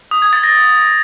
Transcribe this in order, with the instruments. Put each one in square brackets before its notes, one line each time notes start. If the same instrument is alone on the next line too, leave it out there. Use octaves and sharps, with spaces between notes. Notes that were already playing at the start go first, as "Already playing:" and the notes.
[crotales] D#6
G#6
A6
A#6